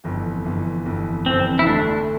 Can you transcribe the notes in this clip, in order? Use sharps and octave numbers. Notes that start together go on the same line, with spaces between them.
G1 F2 E3
G1 F2 E3
G1 F2 E3
G1 F2 E3 C4
E4
D2 D3 A3 D4